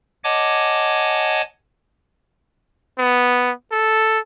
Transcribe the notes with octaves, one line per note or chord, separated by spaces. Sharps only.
C#5 D#5 F#5 G#5 A5 D6
B3
A4